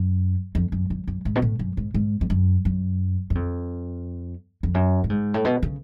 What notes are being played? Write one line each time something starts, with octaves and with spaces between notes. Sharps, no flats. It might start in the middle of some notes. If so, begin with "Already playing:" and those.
Already playing: F#2
F2
F#2
F#2
F#2
G#2
B2
A2
F#2
G#2
G#2
F2
F#2
F#2
F#2
F2
F2
F#2
A2
G#2
A2
B2
C#3